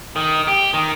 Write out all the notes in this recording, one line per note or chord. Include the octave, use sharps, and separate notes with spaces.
D#3
G4
D#3